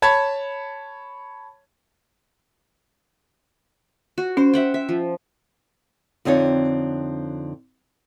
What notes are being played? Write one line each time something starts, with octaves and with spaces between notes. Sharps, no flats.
C#5 A5 B5 G#6
F#4
C#4 C5
E5 F#5 G5
E5
F3
F2 D3 C4 D#4 F4 C#5